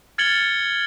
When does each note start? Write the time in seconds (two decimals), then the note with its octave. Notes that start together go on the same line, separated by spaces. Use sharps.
0.18 F6 G#6 A6 C#7 F#7 G7